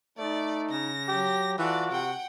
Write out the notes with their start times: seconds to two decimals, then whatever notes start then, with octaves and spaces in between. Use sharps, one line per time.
0.18 A3 D#4 D5
0.71 C#3 A#6
1.08 F#3 G4
1.59 E3 F4 F#4 A4 D5
1.91 C3 F#5 G5